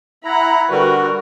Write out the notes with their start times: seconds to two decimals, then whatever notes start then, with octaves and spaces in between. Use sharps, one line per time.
0.24 E4 F#5 A#5 B5
0.70 D3 G3 F#4 A#4 B4